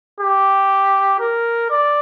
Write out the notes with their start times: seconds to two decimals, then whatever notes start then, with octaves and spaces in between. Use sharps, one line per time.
0.21 G4
1.20 A#4
1.71 D5